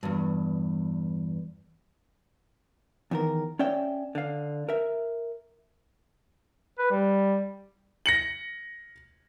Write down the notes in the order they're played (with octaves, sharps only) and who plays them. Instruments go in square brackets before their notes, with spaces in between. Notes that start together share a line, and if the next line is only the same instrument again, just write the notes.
[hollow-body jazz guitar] E2 G2
E2 D#3 A#4
C#4 D5 E5 G5
D3 F5
A#4 E5
[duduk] B4
G3
[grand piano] A#6 C#7 F#7